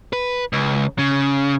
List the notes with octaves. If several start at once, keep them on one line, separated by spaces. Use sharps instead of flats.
B4
C#2
C#3